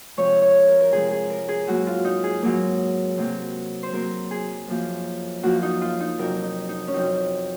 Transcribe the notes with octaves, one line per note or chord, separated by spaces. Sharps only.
C3 F3 G#3 C#5
C#5
A#4
A#4
C3 F3 G#3 G#4
G#4
A#4
G#4
G#2 F#3 A#3 F#4
F4
D#4
G#4
G#2 F#3 A#3
C3 F#3 A#3
C5
C3 F#3 A#3 A#4
G#4
F#2 F3 A#3
F#2 F3 A#3 F#4
D#4
F4
D#4
F2 C3 F#3 A#4
D#4
D#4
C#4
F2 C3 F#3 D#4